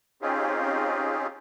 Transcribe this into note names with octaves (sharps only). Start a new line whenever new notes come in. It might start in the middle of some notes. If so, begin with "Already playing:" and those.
C4 C#4 D#4 F4 G4 G#4